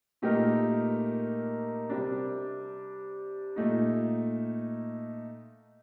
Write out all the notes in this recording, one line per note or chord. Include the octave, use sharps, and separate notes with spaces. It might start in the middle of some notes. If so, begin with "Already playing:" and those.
A#2 A3 D#4 G4 A#4
C3 G3 D4
A#2 A3 D#4